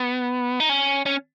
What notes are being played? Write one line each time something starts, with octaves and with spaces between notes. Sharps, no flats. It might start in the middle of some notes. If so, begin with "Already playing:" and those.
Already playing: B3
D#4
C#4
C#4